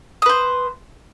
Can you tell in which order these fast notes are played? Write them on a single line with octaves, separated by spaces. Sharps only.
D#6 B4 C5